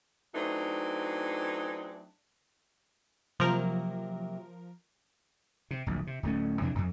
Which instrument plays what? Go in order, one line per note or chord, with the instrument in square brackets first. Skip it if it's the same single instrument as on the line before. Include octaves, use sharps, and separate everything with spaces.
[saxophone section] E3 F#3 A3 C4 D4 D#4
[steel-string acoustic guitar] C3 F#3 A#3 [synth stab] F3 A#4
[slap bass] C3
D1 A#1
C3
D1 G2 A3 C#4
F2 C3 E3 D4
D1 F2